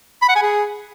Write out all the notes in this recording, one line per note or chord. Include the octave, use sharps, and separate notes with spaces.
B5
F#5
G#5
G#4